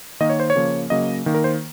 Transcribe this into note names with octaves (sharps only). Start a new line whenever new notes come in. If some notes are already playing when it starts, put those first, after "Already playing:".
D#3 A#3 D#5
C#5
C5
C#5
C#3 F3 A#3
C#3 F#3 A#3 D#5
D#3 A#3
A#4
C5